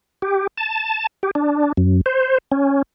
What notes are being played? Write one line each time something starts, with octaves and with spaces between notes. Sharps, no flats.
G4
A5
G4
D4
F#2
C5
C#4